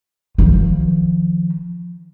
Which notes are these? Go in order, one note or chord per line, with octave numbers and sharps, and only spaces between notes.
D#3 F3